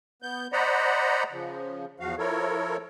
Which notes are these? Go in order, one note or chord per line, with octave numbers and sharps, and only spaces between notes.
B3 G6
C5 D5 D#5 F#5 A#5 B5
C#3 F3
E2 F3 F#4 F5
F3 E4 A4 A#4 C#5